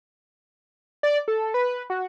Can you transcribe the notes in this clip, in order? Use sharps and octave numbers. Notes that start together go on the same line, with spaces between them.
D5
A4
B4
F#4